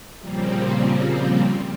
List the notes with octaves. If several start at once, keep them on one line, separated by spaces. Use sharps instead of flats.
A#2 C#3 F3 G3 A#3 C4